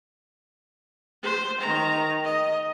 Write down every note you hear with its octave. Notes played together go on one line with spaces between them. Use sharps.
C5
D#3 A#5
D#5